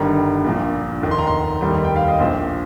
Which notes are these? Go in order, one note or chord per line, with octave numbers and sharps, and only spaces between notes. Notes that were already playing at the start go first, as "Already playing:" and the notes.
Already playing: G1 G2 D#3 G3 A#5
A#1 A#2 F3
F1 D#2 D#3
C6
A#5
C6
F1 D#2 D#3 G3
G5
F5
D#5
A#1 A#2 F3 C5